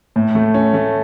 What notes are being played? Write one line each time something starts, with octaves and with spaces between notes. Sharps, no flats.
A2
A3
C#4
A3